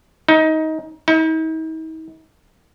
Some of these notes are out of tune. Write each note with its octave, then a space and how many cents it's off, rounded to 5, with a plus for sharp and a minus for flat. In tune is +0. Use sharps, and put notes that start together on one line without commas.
D#4 +20
D#4 +45